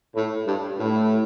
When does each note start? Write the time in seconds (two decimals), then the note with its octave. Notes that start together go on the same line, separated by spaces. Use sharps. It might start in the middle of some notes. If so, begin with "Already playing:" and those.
0.14 A2
0.46 G2
0.79 A2